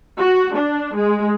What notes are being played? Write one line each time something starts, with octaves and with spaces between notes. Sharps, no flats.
F#4
D4
G#3